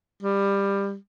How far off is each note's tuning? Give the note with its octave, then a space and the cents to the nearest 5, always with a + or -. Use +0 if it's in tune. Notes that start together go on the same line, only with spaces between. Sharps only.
G3 +20